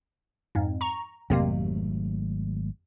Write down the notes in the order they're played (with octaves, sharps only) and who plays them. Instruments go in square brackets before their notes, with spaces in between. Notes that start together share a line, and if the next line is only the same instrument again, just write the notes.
[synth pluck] F2 G#2
A#5 C#6
[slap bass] G#1 F#3 A3 [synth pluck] F2 C3 A#3